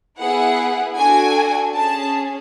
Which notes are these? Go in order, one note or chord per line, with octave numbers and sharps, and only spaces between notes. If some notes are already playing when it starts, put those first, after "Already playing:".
B3 E4 G#4 F#5
D4 F#4 A4 G#5
C#4 G#4 A5